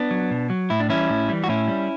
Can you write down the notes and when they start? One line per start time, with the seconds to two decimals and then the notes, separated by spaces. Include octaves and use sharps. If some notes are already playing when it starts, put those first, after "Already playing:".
Already playing: B3 D4
0.11 F#3
0.31 B2
0.50 F#3
0.70 A2 E4
0.80 D4
0.89 E3 G3 C#4 E4
1.09 A2
1.29 E3 G3
1.44 F#4
1.48 A2 C#4 E4
1.68 G3